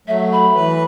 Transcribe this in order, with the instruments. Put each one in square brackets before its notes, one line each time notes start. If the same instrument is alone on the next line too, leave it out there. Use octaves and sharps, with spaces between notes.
[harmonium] F#3 A3 [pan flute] E5
[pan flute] B5
[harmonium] E3 B4